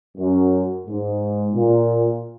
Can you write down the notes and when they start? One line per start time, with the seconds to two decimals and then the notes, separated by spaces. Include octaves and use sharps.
0.17 F#2
0.87 G#2
1.53 A#2